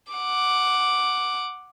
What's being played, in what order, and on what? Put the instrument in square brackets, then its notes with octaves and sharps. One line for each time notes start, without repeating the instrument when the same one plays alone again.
[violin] F#5 D6